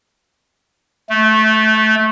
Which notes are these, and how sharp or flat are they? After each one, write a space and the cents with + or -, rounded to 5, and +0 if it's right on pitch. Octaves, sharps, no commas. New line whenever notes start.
A3 -15